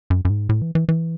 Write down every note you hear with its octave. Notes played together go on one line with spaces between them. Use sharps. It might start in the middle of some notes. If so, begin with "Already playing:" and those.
F#2
F#2
G#2
A2
E3
E3
E3